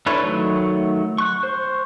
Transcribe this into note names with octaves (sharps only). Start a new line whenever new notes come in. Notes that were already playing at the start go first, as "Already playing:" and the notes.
D4 E4 A4 B4 C#5
D#3 F#3 A3
C#6 F#6
C5